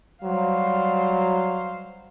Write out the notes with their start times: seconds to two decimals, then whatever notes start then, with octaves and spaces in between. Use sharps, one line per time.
0.24 F#3 G3 C5 F5